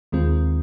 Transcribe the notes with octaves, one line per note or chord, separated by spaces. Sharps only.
D#2 D#3 G#3 C4 F4